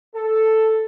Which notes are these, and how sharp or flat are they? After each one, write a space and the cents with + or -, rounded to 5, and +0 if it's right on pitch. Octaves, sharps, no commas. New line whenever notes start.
A4 +0